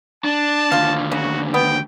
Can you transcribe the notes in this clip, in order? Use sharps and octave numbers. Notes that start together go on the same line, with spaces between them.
D4 A5
D#2 D3 F4 F5
C#3 F#4
B3 G5